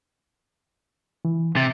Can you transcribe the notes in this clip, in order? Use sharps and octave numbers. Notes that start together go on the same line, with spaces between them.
E3
C3 A6